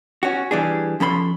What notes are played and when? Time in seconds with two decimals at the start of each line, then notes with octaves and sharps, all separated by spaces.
0.23 C#4 F#4
0.51 E3 G3 D4 G#4
1.00 F3 C#4 A4 B5 C6